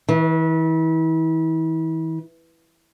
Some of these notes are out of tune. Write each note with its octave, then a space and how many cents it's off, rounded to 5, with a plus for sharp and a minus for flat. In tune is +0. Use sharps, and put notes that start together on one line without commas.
E3 -35